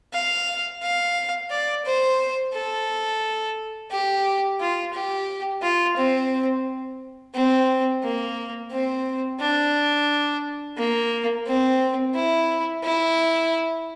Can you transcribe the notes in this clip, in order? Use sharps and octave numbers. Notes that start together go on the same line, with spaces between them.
F5
F5
D5
C5
A4
G4
F4
G4
F4
C4
C4
A#3
C4
D4
A#3
C4
E4
E4